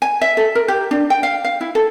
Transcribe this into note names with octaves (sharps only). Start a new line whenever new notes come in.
G#5
E5
A4
A#4
G4
D4
G5
F5
F5
E4
A4